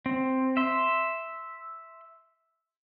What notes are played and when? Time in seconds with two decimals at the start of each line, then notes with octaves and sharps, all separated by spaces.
0.06 C4
0.57 E5 C6